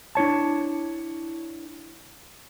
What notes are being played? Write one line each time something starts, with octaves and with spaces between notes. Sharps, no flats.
D4 E4 C#5 A5